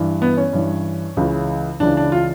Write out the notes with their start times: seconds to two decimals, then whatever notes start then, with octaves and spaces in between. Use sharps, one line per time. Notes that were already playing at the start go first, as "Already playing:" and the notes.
Already playing: G2 E3
0.22 B3
0.37 C#4
0.53 G2 E3
1.17 C#2 C#3 E3
1.80 C#2 C#3 E3 D4
1.97 D4
2.12 F4